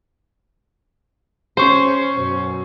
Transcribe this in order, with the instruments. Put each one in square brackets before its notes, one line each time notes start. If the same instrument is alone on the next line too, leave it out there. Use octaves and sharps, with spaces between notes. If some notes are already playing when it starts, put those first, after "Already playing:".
[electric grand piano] C#4 C#6 C7 [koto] C5
[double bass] F#2 B2